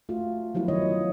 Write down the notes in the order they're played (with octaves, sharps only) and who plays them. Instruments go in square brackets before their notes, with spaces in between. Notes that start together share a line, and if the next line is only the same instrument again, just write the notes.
[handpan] A3 F4 F#4
F3 F#3 B3 E4
D#3 F3 E4 C#5 D#5
F#3